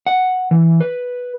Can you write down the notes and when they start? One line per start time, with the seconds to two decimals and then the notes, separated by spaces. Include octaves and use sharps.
0.06 F#5
0.51 E3
0.80 B4